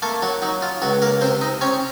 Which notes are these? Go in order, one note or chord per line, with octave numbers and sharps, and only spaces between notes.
A3 A#3 A4
F#3 F#4
F#3 D#4
F4
C#2 F#3 F#4
A#3 A#4
C3 C4 C5
D#4 D#5
C4 C#4 C#5